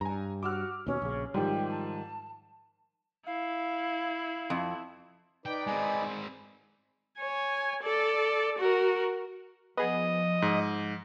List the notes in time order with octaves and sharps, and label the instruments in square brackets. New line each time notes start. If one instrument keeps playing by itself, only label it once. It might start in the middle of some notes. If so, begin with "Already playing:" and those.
[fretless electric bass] G2 [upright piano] G#5 A#5
[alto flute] F#4 [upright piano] D6 E6 F6
[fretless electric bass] D#2 B2 [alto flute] C#4
[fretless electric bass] A#1 C#3
[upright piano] G#2 F3 [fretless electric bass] D#3 G3 [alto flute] G4
[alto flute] A5
[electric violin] E4 [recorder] F5
[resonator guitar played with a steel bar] F2
[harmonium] D#4 B4 D5 [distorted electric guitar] G5
[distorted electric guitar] G#3 C4 [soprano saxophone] G#5
[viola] C#5 G#5
A4 D5
F#4 A#4
[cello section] F3 [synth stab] B3 G#4 [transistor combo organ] D#5
[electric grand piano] G#2